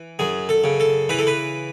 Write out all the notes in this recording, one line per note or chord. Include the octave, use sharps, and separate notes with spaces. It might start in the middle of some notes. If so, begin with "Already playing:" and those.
Already playing: E3
F#2 G#4
A4
C#3
A4
E3 B4
A4
B4